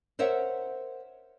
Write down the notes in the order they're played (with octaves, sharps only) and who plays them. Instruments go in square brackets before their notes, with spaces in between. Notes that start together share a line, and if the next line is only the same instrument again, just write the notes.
[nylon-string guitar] A#4 C5 C#5 E5 F#5